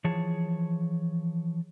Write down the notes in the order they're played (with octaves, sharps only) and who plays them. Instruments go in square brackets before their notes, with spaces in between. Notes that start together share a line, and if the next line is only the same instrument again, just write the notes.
[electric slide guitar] E3 F3 G#4 C#5 A5